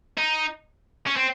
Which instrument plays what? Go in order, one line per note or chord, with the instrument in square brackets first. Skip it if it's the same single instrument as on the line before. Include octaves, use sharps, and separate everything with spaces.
[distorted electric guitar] D#4
C#4
C4